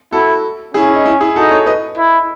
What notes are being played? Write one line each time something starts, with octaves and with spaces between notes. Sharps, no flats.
E4 F#4 A4
C#4 E4 G#4
E4
D#4
E4
E4 G#4
D#4 F#4 A4
A4 C#5
B4 D#5
E4